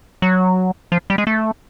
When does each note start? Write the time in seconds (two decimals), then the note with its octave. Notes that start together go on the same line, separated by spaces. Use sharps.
0.22 F#3
0.92 F3
1.10 G3
1.18 G#3
1.27 A3